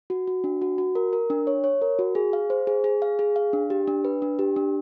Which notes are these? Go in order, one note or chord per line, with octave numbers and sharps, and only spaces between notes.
F#4
F#4
D4
F#4
F#4
A#4
A#4
D4
C#5
C#5
A#4
F#4
G#4
F5
C5
G#4
G#4
F5
G#4
F5
D4
G4
D4
B4
D4
G4
D4